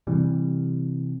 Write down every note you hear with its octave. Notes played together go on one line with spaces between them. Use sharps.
C3 E3 G3